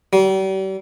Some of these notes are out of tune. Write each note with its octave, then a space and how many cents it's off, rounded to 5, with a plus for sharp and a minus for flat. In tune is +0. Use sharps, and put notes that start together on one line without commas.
G3 -40